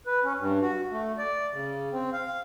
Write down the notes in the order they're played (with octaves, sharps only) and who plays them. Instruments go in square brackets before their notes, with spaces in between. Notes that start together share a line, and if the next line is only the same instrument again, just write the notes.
[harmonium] B4
C#4
G2
F#4
A3
D5
C#3
C4
F5